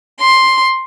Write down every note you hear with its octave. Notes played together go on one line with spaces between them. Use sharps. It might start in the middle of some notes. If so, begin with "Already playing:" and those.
C6